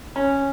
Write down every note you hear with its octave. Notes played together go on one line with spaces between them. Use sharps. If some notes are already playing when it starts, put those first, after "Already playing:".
C#4